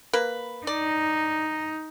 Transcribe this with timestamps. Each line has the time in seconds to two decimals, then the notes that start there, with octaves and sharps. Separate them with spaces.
0.13 A#3 B4
0.67 D#4 D5